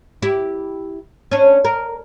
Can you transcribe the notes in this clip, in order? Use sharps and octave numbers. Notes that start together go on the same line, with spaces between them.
E4 G4
C#4 D4
A#4